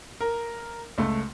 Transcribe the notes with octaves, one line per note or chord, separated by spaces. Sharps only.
A#4
C#2 A3